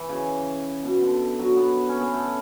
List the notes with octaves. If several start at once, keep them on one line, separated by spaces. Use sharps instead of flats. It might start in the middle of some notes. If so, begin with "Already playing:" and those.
Already playing: E3
C#3
B2
D3
F#3
B3
C#4
B3
A3